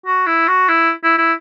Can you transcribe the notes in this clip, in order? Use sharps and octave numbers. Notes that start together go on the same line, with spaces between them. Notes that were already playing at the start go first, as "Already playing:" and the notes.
F#4
E4
F#4
E4
E4
E4